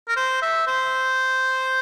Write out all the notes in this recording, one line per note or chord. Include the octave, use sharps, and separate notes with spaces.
A#4
C5
E5
C5